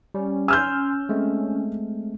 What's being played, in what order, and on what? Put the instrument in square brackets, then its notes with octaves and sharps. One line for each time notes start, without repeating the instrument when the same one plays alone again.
[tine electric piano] G3 [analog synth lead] C#4
[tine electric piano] G#5 C6 [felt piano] E6 F6 G6
[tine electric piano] G#3 A3 C4